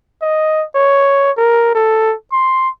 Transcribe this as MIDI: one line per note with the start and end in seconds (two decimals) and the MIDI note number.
0.22 0.64 75
0.75 1.31 73
1.37 1.74 70
1.74 2.15 69
2.32 2.69 84